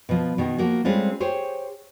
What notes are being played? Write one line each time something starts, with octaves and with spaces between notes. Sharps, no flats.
B2 F3
B2 D#3
F3 A#3 F#4
G3 G#3 C4 C#4 F4 A4
G4 G#4 C5 C#5